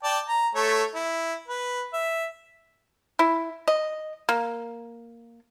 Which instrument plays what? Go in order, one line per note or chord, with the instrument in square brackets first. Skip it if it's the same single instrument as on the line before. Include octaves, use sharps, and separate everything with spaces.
[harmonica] D5 G5 A5
A#5
A3 A4 C#5
E4
B4
E5
[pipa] E4
D#5
A#3